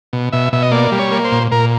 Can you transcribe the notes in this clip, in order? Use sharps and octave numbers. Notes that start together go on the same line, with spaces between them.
B2
B2 E5
B2 E5
D#5
A#3 D5
G3
C#5
A#3
C5
A#2
A#2 A#4